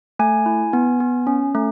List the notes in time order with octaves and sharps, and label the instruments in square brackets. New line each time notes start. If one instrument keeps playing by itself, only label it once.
[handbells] A3 G#5
E4
B3
B3
C#4
A3